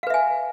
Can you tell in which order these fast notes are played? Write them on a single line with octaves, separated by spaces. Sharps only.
F5 B4 E5 G#5